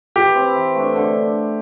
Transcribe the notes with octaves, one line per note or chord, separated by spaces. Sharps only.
E3 G4
C4 E4
E3
A3 D4
D3